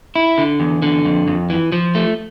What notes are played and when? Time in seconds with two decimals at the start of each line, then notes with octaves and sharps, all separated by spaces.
0.16 E4
0.38 D3
0.60 E2
0.82 D3
1.05 F2
1.28 F2
1.50 E3
1.72 F3
1.95 A3